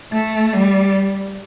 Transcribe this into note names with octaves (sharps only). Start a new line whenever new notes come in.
A3
G3